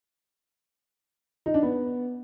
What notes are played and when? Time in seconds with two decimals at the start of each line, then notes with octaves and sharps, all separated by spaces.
1.46 D#4
1.54 D4
1.63 B3